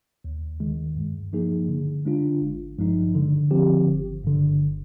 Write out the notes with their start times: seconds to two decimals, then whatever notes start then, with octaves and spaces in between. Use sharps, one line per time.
0.24 D#2
0.60 D#3 G#3
0.97 G2
1.33 F3 A#3 D#4 G#4
1.69 D3
2.06 G#3 D4 F4
2.42 G#1
2.78 G2 F3 G#3 D#4
3.15 D3
3.51 F3 C4 G4
3.87 G1
4.23 G2 D3
4.59 G1